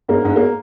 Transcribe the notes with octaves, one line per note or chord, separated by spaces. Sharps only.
G#2 A#3
G#2 G#3
A#3